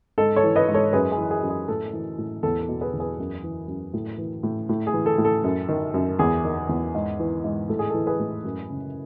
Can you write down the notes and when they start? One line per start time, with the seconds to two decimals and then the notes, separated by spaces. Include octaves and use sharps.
0.18 G#2 A4
0.36 A4 C#5
0.43 E3
0.56 B4 D#5
0.68 G#2
0.74 A4 C#5
0.93 F#2 G#4 B4
1.12 G#4
1.18 E3
1.30 G#4
1.43 F#2
1.50 G#4
1.68 A2 A4
1.93 E3
2.18 A2
2.43 E2 A4
2.62 A4
2.68 B2
2.81 G#4 B4
2.93 E2
3.00 G#4 B4
3.19 F#2
3.43 E3
3.68 F#2
3.94 A2
4.18 E3
4.43 A2
4.69 A2
4.87 G#4
4.93 E3
5.06 A4
5.18 A2
5.25 A4
5.44 F#2
5.69 D#3
5.94 F#2
6.19 E2 G#4
6.44 D#3
6.69 E2
6.95 G#2
7.19 E3
7.44 G#2
7.69 A2 A4
7.79 G#4
7.90 E3 A4
8.07 G#4 B4
8.19 A2
8.44 F#2
8.69 C#3